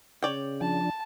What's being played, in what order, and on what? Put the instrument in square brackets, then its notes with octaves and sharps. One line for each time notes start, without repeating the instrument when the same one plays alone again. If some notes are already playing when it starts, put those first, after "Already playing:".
[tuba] C#3 [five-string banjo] C#5 D5 G5
[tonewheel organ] F3 D4 [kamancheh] A5